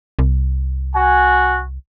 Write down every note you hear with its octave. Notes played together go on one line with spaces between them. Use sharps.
C2
F#4 G#5